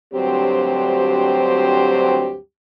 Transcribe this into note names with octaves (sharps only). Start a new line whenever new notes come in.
D2 G2 F#3 C4 G4 C5